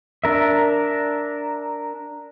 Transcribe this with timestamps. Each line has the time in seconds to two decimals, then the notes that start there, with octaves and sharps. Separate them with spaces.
0.24 D4 A#4 E5